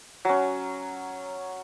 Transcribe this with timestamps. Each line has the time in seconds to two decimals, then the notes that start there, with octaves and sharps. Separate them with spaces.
0.25 F#3 C#4